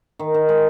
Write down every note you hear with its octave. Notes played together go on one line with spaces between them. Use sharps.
D#3
D#3
G#3